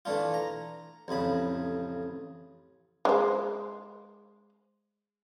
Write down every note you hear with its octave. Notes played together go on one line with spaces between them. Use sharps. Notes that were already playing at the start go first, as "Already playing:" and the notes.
E3 A3 D4 F4
A#5
A1 F2 C#3 B5
G#3 C5